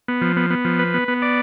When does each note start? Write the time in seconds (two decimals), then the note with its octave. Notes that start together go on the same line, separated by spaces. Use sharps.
0.08 B3
0.21 F3
0.36 B3
0.50 B3
0.65 F3
0.79 B4
0.94 B3
1.08 B3
1.22 D5